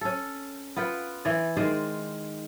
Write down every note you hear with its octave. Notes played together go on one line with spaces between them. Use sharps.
C#4 A4
B3 F4 B4 G5
E3 D5
D#3 G#3 C5 D5